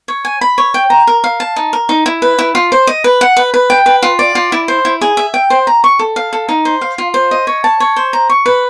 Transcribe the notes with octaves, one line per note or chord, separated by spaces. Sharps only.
C#5
G#5
B5
C#5
G5
A#5
A#4
F5
A5
D#4
A#4
D#4
E4
B4
E4
F4
C5
D#5
B4
F#5
B4
B4
G5
B4
F4
D5
F4
E4
C5
E4
G#4
E5
G5
C5
A#5
C#6
A4
F5
A4
D#4
C5
F5
F4
C5
D#5
C#5
A5
C#5
C5
A#5
C#6
B4